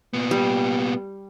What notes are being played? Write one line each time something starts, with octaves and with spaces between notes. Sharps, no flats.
A#2 B3
G3